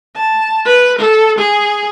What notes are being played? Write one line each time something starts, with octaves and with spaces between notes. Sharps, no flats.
A5
B4
A4
G#4